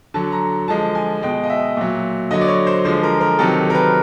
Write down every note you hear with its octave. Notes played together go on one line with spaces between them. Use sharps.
D3 F#3 A5
A#5
D3 F3 G#3 A5
G#5
B2 G#3 G5
D#5
E5
A#2 F#3
D3 F#3 D#5
D5
C#5
C5
D3 F3 G#3 C5
A#4
A#4
C3 D#3 F#3 A4
A#4
B4